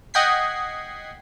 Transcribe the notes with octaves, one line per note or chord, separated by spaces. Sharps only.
D#5 F#5 G5 G#6 B6 C7